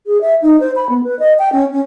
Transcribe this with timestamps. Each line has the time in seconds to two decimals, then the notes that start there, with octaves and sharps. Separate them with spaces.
0.06 G#4
0.21 E5
0.42 D#4
0.60 C5
0.76 B5
0.89 B3
1.04 B4
1.19 D#5
1.39 G5
1.53 C#4
1.72 C#4